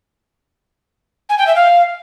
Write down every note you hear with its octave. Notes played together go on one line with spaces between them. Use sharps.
G#5
G5
E5
F5